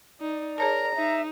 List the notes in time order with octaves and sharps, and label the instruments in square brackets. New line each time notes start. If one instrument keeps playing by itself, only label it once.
[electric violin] D#4 [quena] D5
[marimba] G#4 C#5 A5 [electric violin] A#4 [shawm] A#5
[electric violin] D#4 [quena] E5